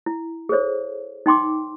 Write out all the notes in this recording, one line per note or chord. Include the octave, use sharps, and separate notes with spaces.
E4
G#4 A4 C5 C#5
D#4 G5 C6 D6